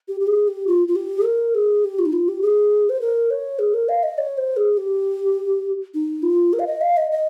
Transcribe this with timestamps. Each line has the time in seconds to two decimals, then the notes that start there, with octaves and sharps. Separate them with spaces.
0.08 G4
0.20 G4
0.27 G#4
0.48 G4
0.67 F4
0.88 F4
0.96 G4
1.25 A#4
1.55 G#4
1.84 G4
1.99 F4
2.06 D#4
2.13 F4
2.28 G4
2.42 G#4
2.89 C5
3.01 A#4
3.31 C#5
3.59 G#4
3.74 A#4
3.89 F5
4.03 D#5
4.18 C#5
4.38 C5
4.57 G#4
4.77 G4
5.94 D#4
6.23 F4
6.53 A#4
6.59 F5
6.67 D#5
6.81 F5
6.97 D#5
7.12 D#5